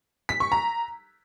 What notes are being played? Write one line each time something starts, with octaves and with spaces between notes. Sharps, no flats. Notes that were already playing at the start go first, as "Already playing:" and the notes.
B6
C#6
A#5